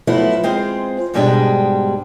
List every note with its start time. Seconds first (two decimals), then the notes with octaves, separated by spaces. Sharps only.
0.07 F3 F#3 A3 B3 E4
0.43 G#3 C4 F4 G#4 C5
1.14 G#2 B2 G3 G#3 D4 G5